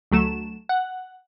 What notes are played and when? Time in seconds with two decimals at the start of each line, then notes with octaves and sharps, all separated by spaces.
0.12 D2 F#3 A3 E7
0.69 F#5